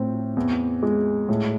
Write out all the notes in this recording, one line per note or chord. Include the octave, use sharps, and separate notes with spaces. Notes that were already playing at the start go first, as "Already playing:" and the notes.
Already playing: A2 C4
E2
G#3
A2